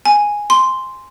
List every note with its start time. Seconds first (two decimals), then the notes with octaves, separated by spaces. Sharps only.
0.05 G#5
0.50 C6